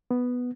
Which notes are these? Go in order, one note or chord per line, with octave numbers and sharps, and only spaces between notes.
B3